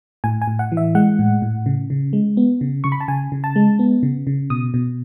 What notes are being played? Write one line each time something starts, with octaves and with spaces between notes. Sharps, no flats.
A2 G#5
G#5
A2
F#5
E3
E5
G#3 F#5
A2
A2
C#3
C#3
G#3
B3
C#3
C#3 C#6
B5
A5
C#3 G#5
C#3
A5
G#3
B3
C#3
C#3
B2 D#6
B2